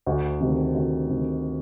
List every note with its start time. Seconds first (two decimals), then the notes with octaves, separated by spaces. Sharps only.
0.07 D2
0.40 C3 D#3
0.74 D2
1.08 C3 D#3